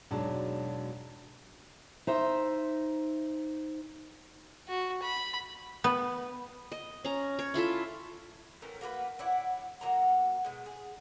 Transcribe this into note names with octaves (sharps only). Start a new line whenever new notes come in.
E1 G#2 F#3 G#3 D4 A5
D#4 C5 E5
F#4
B5
B3
D#5
C#4 A#5
C#5
E4 F4 A4 E5
A2 E3 C#4 A#4
A#3 F#4 G4 B4
E4 C#5 D5 F#5
F#3 A#3 F#4 A#5
B2 G#3
G#4